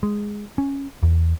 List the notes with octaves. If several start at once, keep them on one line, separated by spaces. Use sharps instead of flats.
G#3
C#4
E2